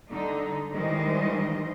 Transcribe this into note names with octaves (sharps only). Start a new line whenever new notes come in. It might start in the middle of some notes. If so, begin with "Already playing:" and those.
D3 G3 D#4
D#3 E3 G3 G#3 C5 D#5